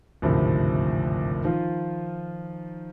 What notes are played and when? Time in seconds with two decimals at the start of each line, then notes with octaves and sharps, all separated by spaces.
0.22 G#1 D2 A2 C3 F3
1.43 D#3 F3 F4